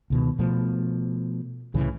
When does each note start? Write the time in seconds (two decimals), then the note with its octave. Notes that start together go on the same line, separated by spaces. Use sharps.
0.10 C#2 B2 D#3
0.39 B2 F3 A3
1.74 C2 A2 C#3 E3